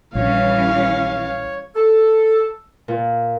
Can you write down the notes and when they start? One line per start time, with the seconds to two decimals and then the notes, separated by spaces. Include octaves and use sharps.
0.15 A#1 E3 G3 C#4 C#5 F5
1.75 A4
2.88 A#2